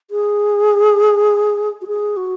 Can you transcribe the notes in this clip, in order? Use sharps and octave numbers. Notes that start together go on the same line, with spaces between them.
G#4
F#4
G#4
F#4